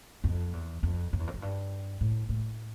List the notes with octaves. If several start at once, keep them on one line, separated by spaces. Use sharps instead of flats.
F2
E2
F2
F#2
E2
F2
F#2
G2
A2
A2